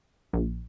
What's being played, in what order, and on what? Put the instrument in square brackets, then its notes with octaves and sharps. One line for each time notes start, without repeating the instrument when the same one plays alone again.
[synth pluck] A#1